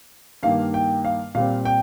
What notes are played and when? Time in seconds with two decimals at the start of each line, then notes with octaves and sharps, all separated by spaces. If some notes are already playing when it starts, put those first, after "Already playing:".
0.43 G2 D#3 A#3 F5
0.74 G5
1.05 F5
1.35 A#2 G3 C4 F5
1.65 G5